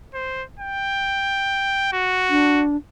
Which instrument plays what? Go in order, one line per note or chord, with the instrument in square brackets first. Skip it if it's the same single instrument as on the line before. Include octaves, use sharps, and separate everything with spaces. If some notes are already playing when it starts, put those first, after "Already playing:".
[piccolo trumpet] C5
G5
F#4
[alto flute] D4